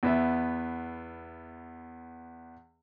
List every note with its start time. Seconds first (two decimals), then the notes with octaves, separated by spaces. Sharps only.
0.03 E2 B3 E5